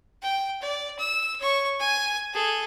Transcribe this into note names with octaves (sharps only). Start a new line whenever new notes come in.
G5
D5
E6
C#5 C#6
G#5
G#4 A4